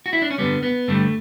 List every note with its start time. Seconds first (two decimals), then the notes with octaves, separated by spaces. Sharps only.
0.06 F#4
0.13 E4
0.22 D4
0.31 C#4
0.38 G2 D3 G3 B3
0.63 B3
0.88 G2 D3 G3 A3